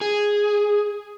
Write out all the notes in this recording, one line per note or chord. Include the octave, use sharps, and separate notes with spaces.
G#4